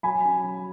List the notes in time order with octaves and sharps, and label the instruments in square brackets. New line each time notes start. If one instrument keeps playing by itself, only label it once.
[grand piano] F#3 [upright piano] G#5 B5
[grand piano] C#4
F#3